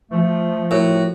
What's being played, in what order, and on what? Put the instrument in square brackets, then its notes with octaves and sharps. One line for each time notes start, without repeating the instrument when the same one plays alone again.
[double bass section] F3 [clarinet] A3
[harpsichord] A2 [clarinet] F#4 [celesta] A#4 C#5